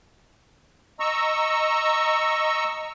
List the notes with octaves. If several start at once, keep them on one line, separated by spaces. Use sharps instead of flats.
D#5 A#5 C#6 E6